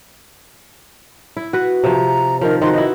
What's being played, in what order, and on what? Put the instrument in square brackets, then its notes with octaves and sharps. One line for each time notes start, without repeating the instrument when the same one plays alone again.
[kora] E4
F#4 B4
[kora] C3 F3 [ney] A#5
[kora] D#3 F3 [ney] A#4
[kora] D#3 F3 F#4 [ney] C6
[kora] B3 E4 [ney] D#5